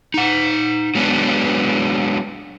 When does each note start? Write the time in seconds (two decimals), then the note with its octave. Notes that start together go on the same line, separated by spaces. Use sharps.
0.14 D#4 F#5
0.95 F#3 G#3 B3 D4 B4